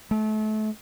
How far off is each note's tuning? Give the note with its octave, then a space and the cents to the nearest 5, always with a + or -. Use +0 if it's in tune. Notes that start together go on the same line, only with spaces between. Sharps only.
A3 -30